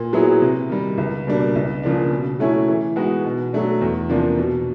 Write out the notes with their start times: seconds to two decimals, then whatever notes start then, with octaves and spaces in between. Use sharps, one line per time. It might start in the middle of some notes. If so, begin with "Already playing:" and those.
Already playing: A#2
0.13 F#3 B3 E4 G#4
0.42 C3
0.70 D#3 G3
0.98 C#2
1.27 B2 G3 A#3 D4
1.55 C#2
1.83 C#3 F3 A#3 D4
2.12 B2
2.39 F#3 A3 C#4 E4
2.68 E3
2.96 G#3 B3 D#4 F#4
3.25 B2
3.53 F#3 A3 D4
3.81 E2
4.10 C3 F3 A#3 D4
4.38 B2